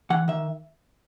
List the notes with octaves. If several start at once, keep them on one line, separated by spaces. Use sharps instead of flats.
E3 F#5
D#3 E5